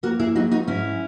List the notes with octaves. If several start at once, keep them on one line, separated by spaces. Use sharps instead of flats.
A#3 F#4 A#4
E4 G#4
F#3 D#4 F#4
D#4 F#4
G#2 C#4 E4